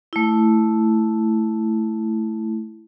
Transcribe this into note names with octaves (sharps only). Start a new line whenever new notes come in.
A3 E4